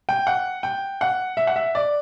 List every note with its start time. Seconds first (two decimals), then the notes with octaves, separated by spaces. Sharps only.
0.09 G5
0.27 F#5
0.63 G5
1.01 F#5
1.37 E5
1.47 F#5
1.56 E5
1.75 D5